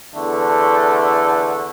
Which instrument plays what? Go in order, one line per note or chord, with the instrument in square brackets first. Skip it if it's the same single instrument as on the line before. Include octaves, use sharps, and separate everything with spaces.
[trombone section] E2 D3 A3